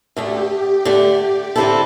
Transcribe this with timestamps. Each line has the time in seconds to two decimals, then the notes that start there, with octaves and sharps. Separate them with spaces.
0.17 D2 D3 A3 G4
0.85 D3 A3 D4
1.56 D3 C4 E4 A4